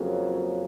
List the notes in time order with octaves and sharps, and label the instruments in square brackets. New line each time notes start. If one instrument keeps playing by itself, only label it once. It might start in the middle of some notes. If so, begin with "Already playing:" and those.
Already playing: [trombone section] F2 C#3 F#3 A#3